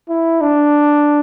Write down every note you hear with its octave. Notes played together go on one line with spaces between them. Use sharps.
E4
D4